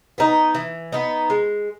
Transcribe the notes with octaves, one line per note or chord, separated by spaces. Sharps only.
B3 D#4
E3
B3 D#4
G#3